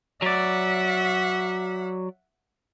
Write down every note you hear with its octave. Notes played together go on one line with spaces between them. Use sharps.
F#3 D5 E5 F#5